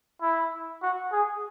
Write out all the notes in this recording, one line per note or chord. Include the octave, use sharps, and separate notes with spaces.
E4
F#4
G#4